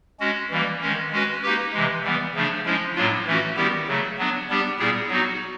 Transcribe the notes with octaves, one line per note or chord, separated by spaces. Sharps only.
G#3 C#4 F#4
E3 G3 A#3
D#3 G#3 C#4
G#3 C#4 F#4 B4
A#3 D#4 G4 B4
C3 E3 G#3
E3 G3 B3
C#3 F3 A3 D4
F3 G#3 C#4 E4
A2 F#3 A#3 D4 F4
E3 A3 C#4 F#4
D#3 G3 B3 E4 G4
C#3 F#3 A3
F#3 B3 D4
G3 B3 D4 G4
A#2 G3 B3 E4 G#4
F#3 B3 D#4 F#4